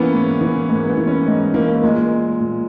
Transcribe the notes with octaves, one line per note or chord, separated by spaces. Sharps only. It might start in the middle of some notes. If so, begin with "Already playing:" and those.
Already playing: E3 A#3 B3 C#4
G#2
E3
G#2 A#3
B3
E3
C#4
G#2 D#4
E3 A#3
A#3
A#2 G#3
A#2